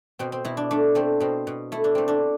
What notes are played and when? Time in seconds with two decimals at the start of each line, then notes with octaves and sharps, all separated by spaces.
0.19 B2 C4
0.32 C4
0.45 B2 E4
0.57 D4
0.71 A3 D4
0.95 A3 C4
1.20 B2 C4
1.47 B2
1.72 A3 E4
1.84 D4
1.95 A3 C4
2.08 D4